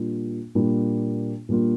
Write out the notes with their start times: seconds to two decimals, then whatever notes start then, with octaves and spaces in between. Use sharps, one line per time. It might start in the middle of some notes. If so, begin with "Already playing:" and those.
Already playing: A#2 G3 A#3 D4 F4
0.55 A#2 G3 A#3 D4 F4
1.49 A#2 G3 A#3 D4 F4